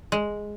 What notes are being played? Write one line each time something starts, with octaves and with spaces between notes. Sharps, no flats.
G#3